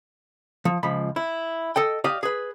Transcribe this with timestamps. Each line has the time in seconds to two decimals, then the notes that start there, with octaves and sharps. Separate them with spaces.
0.65 F3
0.83 C#2 F3 B5
1.16 E4
1.76 A4 D#5 G5
2.04 G4 D5 D#5 F5
2.23 G#4 B4